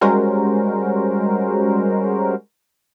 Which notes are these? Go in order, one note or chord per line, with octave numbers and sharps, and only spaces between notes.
G3 G#3 C#4 F#4 A#4 C5